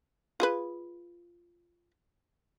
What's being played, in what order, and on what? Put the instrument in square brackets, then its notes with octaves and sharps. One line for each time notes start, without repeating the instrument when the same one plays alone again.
[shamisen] F4 G#4 B4